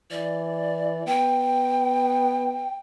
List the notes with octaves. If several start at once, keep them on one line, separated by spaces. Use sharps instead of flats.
E3 D5
B3 G5